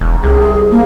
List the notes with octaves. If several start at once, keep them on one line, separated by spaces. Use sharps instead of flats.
E1
C2 G#4
A#3